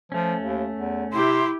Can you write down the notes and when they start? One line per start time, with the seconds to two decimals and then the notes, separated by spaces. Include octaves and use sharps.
0.12 F3 A3 C#4
0.42 D#2
0.77 E2
1.12 C3 E4 G4 C6